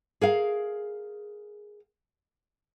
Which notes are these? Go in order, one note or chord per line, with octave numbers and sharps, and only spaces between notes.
G#4 A#4 F5